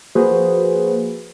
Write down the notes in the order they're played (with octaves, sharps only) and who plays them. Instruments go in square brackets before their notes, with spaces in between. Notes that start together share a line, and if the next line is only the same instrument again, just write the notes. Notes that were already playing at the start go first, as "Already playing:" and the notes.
[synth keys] F3 A#3 F#4 G#4 B4 C5